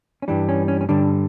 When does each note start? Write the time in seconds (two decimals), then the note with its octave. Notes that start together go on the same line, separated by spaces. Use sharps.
0.22 C#4
0.28 G2 E3 G3 D4
0.49 C#4
0.68 C#4
0.81 C#4
0.89 G2 D3 G3 D4